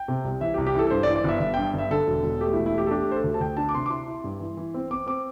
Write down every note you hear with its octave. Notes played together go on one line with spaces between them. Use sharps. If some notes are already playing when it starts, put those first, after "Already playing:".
Already playing: G5
C3
C2
E3 E5
G4
C2
G4
E3 A4
A4
G2 C5
D5
E3
D5
G1 E5
G1 E5
G2 G5
G1 E5
D3 A4
E1
E1
A3 G4
E1 E4
E4
A3 G4
A4
D4 G4
A3 C5
A4
D2
A5
D2 G5
D4 A5
D6
C3 C6
D6
E4 C6
E4
G2
E3
E3
C4
C4 D6
C4 D6